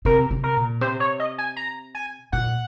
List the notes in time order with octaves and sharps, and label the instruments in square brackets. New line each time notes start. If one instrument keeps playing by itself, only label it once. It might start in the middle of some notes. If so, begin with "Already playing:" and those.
[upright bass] C3 [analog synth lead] A#4
[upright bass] C3
[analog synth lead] A#4
[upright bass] A#2
[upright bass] C3 [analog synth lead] C5
[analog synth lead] C#5
D#5
G#5
A#5
G#5
[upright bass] A#2 [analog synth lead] F#5